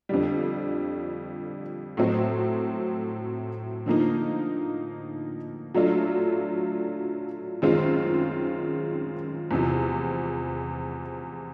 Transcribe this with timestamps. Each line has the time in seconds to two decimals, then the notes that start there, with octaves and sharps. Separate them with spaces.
0.09 F2 D3 G3
1.97 A2 F#3 A3 C4
3.86 D3 F3 A#3 D#4
5.75 F#3 A3 D4 F4
7.62 F#2 D#3 G#3 C4 F4
9.51 E2 C3 F3